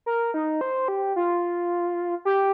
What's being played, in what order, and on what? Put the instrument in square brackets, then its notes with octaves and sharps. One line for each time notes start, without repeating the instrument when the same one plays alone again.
[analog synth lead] A#4
D#4
C5
G4
F4
G4